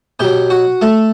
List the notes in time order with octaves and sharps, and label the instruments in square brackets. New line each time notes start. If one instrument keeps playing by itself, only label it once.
[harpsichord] B2 F#3 G4 G5
F#4 F#5
A3 A4